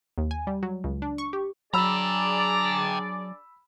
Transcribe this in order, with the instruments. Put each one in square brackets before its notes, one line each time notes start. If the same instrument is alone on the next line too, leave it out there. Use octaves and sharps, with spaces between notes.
[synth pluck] D#2
G#5
G3
F#3
C#2
D4
C#6
G4
[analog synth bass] F#3 [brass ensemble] D4 G#4 D5 [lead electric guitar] G5 A#5 [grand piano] B5 E6